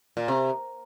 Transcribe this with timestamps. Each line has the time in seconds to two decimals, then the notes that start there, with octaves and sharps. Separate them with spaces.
0.17 A#2
0.28 C3